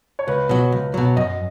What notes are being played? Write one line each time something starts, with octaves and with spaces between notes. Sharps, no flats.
C#5
C#2 B4
B2 F#3
C#2
B2 F#3
F#2 D#5